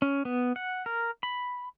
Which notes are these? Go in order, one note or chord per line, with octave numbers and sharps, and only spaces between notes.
C#4
B3
F#5
A#4
B5